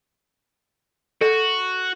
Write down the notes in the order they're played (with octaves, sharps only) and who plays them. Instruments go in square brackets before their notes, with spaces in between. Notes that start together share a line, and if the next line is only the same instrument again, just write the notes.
[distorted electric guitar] F#4 [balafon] A4